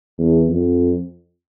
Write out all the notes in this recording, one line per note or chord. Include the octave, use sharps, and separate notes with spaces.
E2
F2